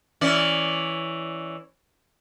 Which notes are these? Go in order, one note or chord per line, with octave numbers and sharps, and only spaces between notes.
E3 C#4 D5